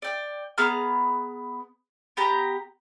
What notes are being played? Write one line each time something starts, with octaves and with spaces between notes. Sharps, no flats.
D5 G5
B3 G#4 A#5 F6
B3 G4 A#5